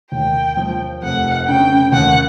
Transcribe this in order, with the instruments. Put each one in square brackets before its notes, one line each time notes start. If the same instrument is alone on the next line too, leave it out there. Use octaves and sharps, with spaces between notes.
[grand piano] D#2 [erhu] G5
[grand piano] F3
[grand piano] F1 [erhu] F#5
[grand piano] C#3 [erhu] G5
[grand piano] D#2 [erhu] F#5